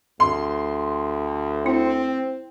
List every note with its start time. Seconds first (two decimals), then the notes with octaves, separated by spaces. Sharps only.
0.20 D2 C6
1.66 C4 E4